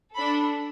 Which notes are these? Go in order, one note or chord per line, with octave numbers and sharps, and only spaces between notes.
D4 A4 B5